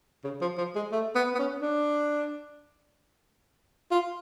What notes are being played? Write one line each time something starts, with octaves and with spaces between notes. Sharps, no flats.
C#3
F3
F3
G#3
A3
B3
B3
C#4
D4
F4